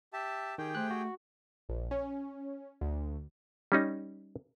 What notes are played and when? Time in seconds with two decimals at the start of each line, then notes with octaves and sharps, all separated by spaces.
0.13 G4 E5 A5
0.58 D#3 G4 G#4 G5
0.75 A3 C5 F#6
0.91 F#4
1.69 A#1
1.91 C#4
2.81 D2
3.72 G3 C#4 D#4